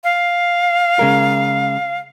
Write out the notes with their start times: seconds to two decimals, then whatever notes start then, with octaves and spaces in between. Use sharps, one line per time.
0.04 F5
0.99 C#3 G#3 A#4